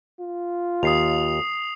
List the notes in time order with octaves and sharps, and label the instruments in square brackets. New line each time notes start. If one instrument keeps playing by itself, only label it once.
[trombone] F4
[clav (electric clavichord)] D#2 [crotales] D#6 C7 F7